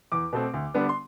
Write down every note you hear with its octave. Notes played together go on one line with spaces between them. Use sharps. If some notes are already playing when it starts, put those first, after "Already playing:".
E2 D6
B2 A3 C4
D2
D3 G3 B3 D4
C6